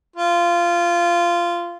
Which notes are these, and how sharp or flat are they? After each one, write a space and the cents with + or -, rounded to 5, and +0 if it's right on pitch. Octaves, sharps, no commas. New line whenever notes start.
F4 -15